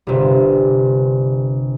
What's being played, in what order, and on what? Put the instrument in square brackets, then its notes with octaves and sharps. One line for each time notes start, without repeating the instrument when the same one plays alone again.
[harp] G1 C3